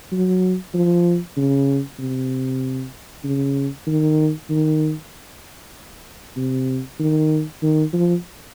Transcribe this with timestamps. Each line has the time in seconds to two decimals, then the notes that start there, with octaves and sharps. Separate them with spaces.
0.12 F#3
0.74 F3
1.37 C#3
1.99 C3
3.24 C#3
3.87 D#3
4.50 D#3
6.37 C3
7.00 D#3
7.62 D#3
7.93 F3